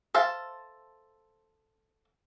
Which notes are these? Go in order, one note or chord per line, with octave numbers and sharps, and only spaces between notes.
A4 C5 E5 F5 A5